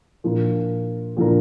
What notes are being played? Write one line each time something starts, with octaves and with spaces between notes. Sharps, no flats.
A#2 F3 D4 A#4
A#2 F3 D4 A#4